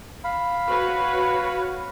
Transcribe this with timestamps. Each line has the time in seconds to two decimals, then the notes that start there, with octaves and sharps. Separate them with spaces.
0.24 F5 B5
0.67 F#4 B4 C#5